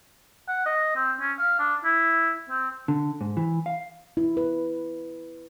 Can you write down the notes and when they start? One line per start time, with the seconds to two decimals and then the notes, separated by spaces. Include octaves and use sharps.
0.48 F#5
0.66 D#5
0.96 C4
1.21 C#4
1.39 F5
1.59 D4
1.84 E4
2.50 C4
2.88 D3
3.21 G#2
3.37 E3
3.66 F5
4.17 E4
4.37 B4